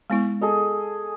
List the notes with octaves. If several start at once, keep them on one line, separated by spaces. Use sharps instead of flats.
G#3 B3 E4
G#4 A4 D#5